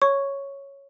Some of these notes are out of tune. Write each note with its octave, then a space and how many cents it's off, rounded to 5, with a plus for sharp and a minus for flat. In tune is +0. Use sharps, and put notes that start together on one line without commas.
C#5 +0 C#6 +0